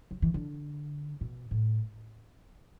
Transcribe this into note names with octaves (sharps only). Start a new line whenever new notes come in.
F#3
E3
D3
B2
A2